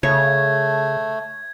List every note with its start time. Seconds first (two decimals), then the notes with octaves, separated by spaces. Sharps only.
0.03 C#3 A3 C#5 G#6